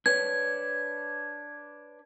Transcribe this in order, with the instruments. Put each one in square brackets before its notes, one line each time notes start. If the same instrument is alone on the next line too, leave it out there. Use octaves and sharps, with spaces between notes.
[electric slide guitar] D4 B4 C#5 [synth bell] G#6